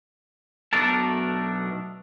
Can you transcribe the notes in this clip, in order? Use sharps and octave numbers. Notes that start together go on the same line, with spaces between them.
B1 B2 A3 D4 A#4 A5